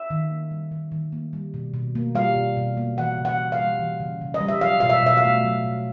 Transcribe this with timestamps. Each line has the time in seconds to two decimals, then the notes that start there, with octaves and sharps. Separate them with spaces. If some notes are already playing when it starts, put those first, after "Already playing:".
Already playing: E5
0.10 D#3
0.31 A#3
0.51 G3
0.72 D#3
0.92 D#3
1.12 A#3
1.33 G3
1.54 B2
1.74 B2
1.95 A#3
2.15 G3 F5
2.35 B2
2.57 B2
2.77 A#3
2.97 E3 F#5
3.18 C#3
3.25 F#5
3.39 C#3
3.52 F5
3.59 G3
3.79 E3
4.00 C#3
4.21 C#3
4.34 D#5
4.41 G3
4.48 E5
4.61 F#3 F5
4.80 B2 F5
4.90 E5
5.03 B2 E5
5.17 F5
5.24 A3
5.44 F#3
5.64 B2